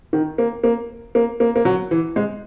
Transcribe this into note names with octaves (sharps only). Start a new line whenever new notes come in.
D#3
A#3
A#3
A#3
A#3
A#3
F#3
E3
G#3